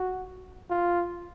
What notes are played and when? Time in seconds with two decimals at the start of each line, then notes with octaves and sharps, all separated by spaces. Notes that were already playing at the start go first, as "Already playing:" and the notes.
Already playing: F#4
0.70 F4